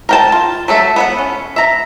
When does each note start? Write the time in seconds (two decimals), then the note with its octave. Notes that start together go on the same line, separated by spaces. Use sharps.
0.09 A#4 G5 A5
0.32 F4
0.68 F#3 A3 A4 E5
0.96 B3 E5 F#5
1.19 C#4
1.56 E5 A#5